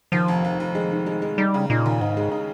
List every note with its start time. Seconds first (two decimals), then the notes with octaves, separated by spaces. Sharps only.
0.12 D#2 F3
0.28 F1
0.44 F1
0.60 F1
0.75 G#3
0.91 D#3
1.06 G#3
1.22 G#3
1.38 G3 D#4
1.54 C#3
1.70 A#2 D#4
1.86 D#2
2.01 G#2 D#4
2.17 G#3
2.32 D#4